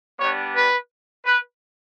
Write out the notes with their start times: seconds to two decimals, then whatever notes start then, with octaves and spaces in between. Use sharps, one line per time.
0.19 G3 B3 D4 C#5
0.55 B4
1.25 B4